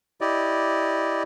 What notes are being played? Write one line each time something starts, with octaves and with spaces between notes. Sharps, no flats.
E4 G4 D5 D#5